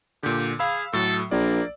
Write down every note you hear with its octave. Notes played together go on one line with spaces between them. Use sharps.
A#2 D3 G4
G#4 F5 B5 E6
A2 F#3 A4
A#1 A#3 D5